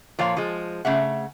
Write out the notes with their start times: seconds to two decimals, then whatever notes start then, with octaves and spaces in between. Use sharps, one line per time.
0.19 A#2 F3 C#5 F5
0.37 F3 G#3
0.85 C#3 A3 E5 F#5